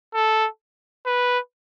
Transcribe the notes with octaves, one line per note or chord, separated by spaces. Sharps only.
A4
B4